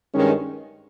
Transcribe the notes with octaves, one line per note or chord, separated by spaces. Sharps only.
G2 D#3 G#3 C#4